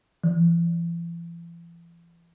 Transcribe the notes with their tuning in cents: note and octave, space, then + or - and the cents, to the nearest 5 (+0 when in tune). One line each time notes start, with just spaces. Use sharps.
E3 +45